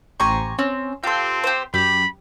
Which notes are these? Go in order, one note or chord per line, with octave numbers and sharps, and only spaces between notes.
A1 G4 C5 G#5 A#5 C#6
C4 C#4
C4 F4 G4 A4 C6
G4 C5
F#2 G4 B5